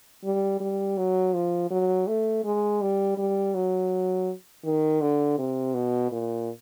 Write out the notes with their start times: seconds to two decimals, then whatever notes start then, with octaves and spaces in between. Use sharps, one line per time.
0.24 G3
0.60 G3
0.98 F#3
1.34 F3
1.70 F#3
2.07 A3
2.44 G#3
2.81 G3
3.18 G3
3.54 F#3
4.64 D#3
5.01 D3
5.38 C3
5.74 B2
6.11 A#2